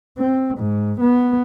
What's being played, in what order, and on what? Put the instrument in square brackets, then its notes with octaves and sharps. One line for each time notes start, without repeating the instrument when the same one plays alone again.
[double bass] C4
G#2
B3